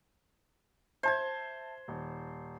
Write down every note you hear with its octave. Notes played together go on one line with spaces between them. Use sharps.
C5 E5 A5 G#6
D#1